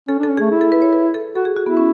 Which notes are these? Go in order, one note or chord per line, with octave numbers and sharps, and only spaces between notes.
C#4 A4
D4
A4
C#4
A3 G#4
E4
A4
B4
C#5
B4
A4
F#4 A4
G#4
F#4
B3 E4
C#4